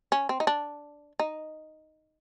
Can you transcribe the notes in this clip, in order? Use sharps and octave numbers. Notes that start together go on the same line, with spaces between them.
C#4
C4
D#4
D4
D#4